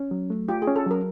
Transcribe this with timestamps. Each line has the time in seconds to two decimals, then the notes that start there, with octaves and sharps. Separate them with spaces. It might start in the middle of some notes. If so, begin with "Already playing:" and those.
Already playing: C#4
0.11 F#3
0.30 A3
0.49 F4 G4
0.62 G#4
0.67 C#4
0.76 A4
0.86 F#3 A#4